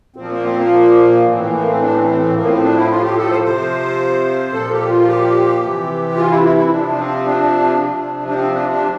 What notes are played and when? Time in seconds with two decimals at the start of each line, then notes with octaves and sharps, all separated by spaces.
0.16 A#2 F3 C4
0.30 A#3
0.44 C4
0.57 A#3
1.26 A2 E3 C4
1.39 A#3
1.53 A#3
1.66 C4
1.81 D4
1.94 C4
2.07 C4
2.21 C4
2.35 A2 F3 A#3
2.48 C4
2.62 D4
2.75 E4
2.89 F4
3.03 G4
3.16 A4
3.30 C5
3.44 C3 F3 C5
4.52 A#2 F3 A4
4.71 G4
4.89 F4
5.07 G4
5.62 C3 E3
6.16 F4
6.30 E4
6.44 E4
6.57 E4
6.71 C3 F3 D4
6.98 C4
7.25 D4
7.80 C3 F3
8.28 D4
8.34 C4
8.52 D4
8.71 D4